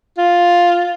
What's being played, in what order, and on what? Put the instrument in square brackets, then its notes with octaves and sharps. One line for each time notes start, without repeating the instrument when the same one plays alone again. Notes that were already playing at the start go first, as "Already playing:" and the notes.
[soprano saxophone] F4